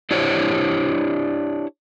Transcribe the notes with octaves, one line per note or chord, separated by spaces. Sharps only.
D4 E4 G4 C5 C#5